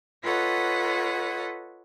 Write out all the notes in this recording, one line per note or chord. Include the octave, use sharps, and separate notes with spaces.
F4 A4 B4 C#5 D#5 F#5